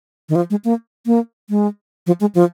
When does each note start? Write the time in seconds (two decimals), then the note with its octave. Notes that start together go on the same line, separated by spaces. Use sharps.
0.29 D#3
0.35 F3
0.50 G#3
0.65 A#3
1.06 A#3
1.50 G#3
2.07 F3
2.20 G#3
2.35 F3